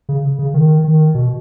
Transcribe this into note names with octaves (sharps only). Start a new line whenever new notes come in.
C#3
C#3
D#3
D#3
B2